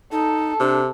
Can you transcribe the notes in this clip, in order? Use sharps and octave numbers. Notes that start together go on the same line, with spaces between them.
D#4 A4
C3 D4